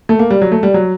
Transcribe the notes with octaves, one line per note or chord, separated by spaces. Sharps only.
A3
A#3
G3
F#3
A3
G3
F#3